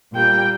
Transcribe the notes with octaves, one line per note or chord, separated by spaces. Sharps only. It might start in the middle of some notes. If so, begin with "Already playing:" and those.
A#2 G3 A#3 G5